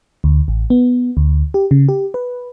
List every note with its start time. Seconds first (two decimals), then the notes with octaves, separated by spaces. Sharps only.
0.24 D2
0.48 A1
0.70 B3
1.17 D2
1.54 G4
1.71 C#3
1.89 G4
2.14 B4